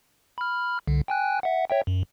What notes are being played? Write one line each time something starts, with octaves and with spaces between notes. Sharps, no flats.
B5 F6
C2 D3
G5 G#5 F#6
E5 F#5
C#5 E5 G5
F#2